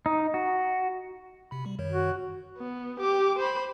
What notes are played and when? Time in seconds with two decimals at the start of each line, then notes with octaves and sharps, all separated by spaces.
0.06 D#4
0.34 F#4
1.51 C3 B5
1.66 G3
1.79 F#2 D#3 C#5
1.91 F#4
2.58 B3
3.00 G4 D6
3.39 C5 B5